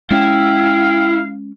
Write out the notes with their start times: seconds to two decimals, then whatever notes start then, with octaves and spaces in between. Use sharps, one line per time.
0.11 G#3 C#4 E4 F5 G5